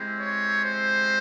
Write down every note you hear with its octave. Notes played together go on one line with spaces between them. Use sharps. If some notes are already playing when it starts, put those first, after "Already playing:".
Already playing: G#3 C4 E4 G4
C#5
C5